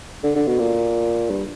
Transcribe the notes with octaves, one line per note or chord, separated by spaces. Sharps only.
D3
D3
B2
A#2
G2